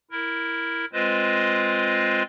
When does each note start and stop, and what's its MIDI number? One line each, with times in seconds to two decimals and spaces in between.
0.11 0.85 64
0.11 0.85 70
0.93 2.23 56
0.93 2.23 60
0.93 2.23 65
0.93 2.23 71
0.93 2.23 72
0.93 2.23 75